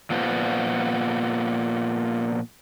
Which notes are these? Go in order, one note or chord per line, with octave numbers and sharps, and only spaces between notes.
A#2 F3 B3